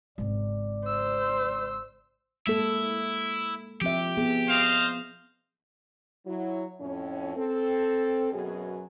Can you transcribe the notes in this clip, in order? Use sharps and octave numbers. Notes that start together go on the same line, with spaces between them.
G#1 C#3 D5
C5 E6
G#3 A#3 E4 A4
F3 C4 G4 E5
B3 G#4
C5 D#5 F5
F#3 E4
F2 A2 C#4
C4 A4
F#2 B2 F#3 B3 G#4